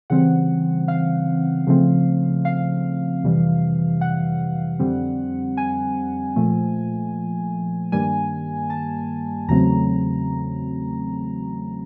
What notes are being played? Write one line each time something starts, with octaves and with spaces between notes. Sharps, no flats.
C#3 E3 G3 C4 F#5
F5
C#3 F3 A3 C4
F5
F2 C3 E3 G3
F#5
F2 D3 G3 C4
G#5
A#2 F3 A3
G2 D#3 G3 A#3 G#5
A5
E2 C#3 F#3 A3 C4 A#5